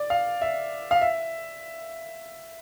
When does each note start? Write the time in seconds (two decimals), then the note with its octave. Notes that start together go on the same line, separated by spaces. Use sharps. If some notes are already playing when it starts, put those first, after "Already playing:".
Already playing: D5
0.10 F5
0.42 E5
0.91 F5
1.01 E5